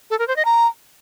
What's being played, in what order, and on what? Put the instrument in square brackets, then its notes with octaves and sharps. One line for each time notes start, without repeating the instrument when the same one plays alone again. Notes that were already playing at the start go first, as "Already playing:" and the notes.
[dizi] A4
A#4
C5
D#5
A#5